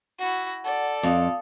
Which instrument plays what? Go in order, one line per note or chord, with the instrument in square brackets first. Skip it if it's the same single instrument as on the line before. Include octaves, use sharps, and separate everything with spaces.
[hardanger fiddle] E4 F#4
[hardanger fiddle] A4 D5 [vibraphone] F#5
[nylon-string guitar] F2 [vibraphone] F5 D#6